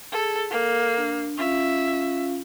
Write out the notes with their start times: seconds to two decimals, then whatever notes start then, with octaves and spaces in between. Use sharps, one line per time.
0.12 G#4 A4
0.51 A#3 A4
0.97 D4
1.38 C#4 F4 E5 F5